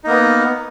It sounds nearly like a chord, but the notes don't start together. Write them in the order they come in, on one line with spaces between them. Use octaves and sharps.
D#4 A#3 B3